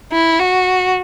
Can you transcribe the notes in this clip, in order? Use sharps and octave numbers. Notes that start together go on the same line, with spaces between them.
E4
F#4